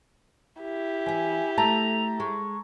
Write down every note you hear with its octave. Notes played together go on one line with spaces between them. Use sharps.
E4 G4
E3 E5 G#5
A3 A5 A#5 F7
G#3 C#6